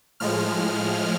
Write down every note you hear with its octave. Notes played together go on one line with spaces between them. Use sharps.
A2 F3 G#3 F6